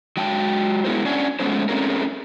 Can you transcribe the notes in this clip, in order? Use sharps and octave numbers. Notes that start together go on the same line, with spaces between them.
F#3 G#3 G5 A5
G#3 B3 E4 G#4 A#4 C5
C#4 D4 F#5 G#5
G#3 A3 B3 C#4 C5
A3 C4 C#4 G#4 A#4